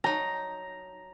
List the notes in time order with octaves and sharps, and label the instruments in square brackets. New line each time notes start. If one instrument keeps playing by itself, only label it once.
[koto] F#3 D#4 [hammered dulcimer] A#5